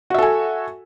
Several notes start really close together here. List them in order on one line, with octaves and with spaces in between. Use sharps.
F#4 E5 A4 G#5